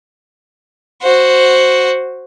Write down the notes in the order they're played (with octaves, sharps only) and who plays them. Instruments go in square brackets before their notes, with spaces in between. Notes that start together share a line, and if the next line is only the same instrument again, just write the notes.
[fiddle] F#4 C5